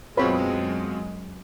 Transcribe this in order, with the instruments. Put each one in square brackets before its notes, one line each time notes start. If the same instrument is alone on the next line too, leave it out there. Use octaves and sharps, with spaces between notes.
[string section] F#2 G#3 [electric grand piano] B2 C4 F4 [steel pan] B4 C#5 B5